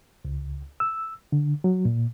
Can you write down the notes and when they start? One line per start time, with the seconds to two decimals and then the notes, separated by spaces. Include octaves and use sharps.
0.25 C#2
0.80 E6
1.32 D3
1.64 F#3
1.85 A#2